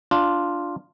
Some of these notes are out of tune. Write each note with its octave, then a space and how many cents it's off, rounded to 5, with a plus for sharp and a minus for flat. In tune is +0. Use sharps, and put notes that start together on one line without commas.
D4 +0 F4 +0